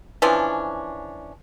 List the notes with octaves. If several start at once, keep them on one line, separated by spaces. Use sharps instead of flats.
E3 F3 C#4 D4